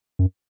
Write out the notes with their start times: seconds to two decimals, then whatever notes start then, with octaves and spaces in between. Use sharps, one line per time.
0.19 F#2